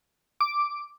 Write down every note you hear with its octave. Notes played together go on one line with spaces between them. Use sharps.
D6